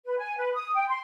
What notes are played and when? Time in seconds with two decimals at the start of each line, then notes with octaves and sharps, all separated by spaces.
0.06 B4
0.18 G#5
0.38 B4
0.53 D#6
0.75 G5
0.88 C6